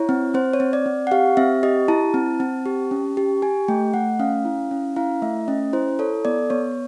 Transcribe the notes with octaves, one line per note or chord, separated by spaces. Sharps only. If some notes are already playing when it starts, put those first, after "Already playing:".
Already playing: E4 C#5
C4
C4 C5
C#5
C4
D5
C4
F#5
G4 F5
C4 E5
G4 D#5
E4 A5
C4
C4
G4
C#4
G4
G4 G#5
A3 G5
A3 F#5
C#4 F5
E4
C#4
E4 F5
A3 E5
C#4 D#5
E4 C5
A4 C#5
B3 D5
B3 C#5